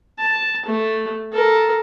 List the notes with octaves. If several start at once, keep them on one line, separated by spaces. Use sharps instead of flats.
A5
A3
A4 A#4